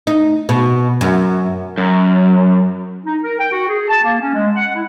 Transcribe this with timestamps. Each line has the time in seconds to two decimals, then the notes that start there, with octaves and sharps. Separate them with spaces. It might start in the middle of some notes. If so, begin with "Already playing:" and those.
0.07 D#4
0.49 B2
1.01 F#2
1.78 F#2
3.06 D#4
3.23 A#4
3.40 G5
3.52 F#4
3.68 G#4
3.88 A5
4.03 A#3
4.21 C#4
4.34 G#3
4.56 F#5
4.75 E4